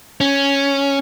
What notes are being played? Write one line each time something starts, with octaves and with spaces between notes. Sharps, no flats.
C#4